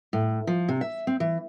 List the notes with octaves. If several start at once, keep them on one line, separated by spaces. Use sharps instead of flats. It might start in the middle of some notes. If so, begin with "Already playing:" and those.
A2
F3
C3
E5
C4
E3